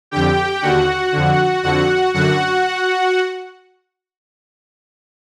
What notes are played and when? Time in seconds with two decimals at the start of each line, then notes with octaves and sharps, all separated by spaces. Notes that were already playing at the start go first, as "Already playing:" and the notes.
0.11 F2 D3 G4 G5
0.62 D#2 D3 F#4 F#5
1.12 F2 D3
1.63 F2 D3 F#4 F#5
2.14 F#2 D3 F#4 F#5